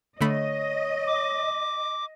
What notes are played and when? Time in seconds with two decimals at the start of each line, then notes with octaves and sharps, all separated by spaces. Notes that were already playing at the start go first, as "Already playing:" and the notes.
0.21 D3 A3 C#5 D#5 B5
1.07 D6